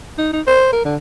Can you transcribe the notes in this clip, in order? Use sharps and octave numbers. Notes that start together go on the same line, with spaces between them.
D#4
D#4
C5
A#4
D3